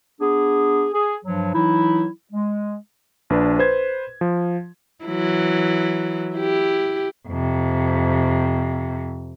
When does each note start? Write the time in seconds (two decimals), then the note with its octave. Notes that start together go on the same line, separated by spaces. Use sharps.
0.20 B3 D4 G#4
0.93 G#4
1.25 G2 F3 F#3
1.54 E3 F#3 D#4 E4
2.32 G#3
3.30 A#1 D4 B4
3.59 B4 C5 G#6
4.21 F3
5.05 E3 F#3 E4
6.34 E4 G4
7.28 F2 C3